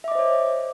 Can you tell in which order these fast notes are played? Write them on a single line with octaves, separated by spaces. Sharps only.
E5 D6 D#5 C5 C#5